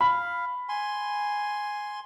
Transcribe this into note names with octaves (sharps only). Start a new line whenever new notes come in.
F5 B5
G#5 C6